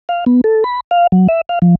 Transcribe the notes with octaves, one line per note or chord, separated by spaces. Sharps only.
F5
B3
A4
B5
F5
F#3
E5
F5
F3